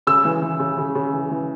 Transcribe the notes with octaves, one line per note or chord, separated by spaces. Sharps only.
C#3 E6
E3
E3
C#3
C#3
C#3
E3
E3